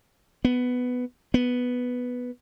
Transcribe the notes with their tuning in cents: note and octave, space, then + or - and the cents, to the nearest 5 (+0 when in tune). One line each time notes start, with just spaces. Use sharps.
B3 +10
B3 +0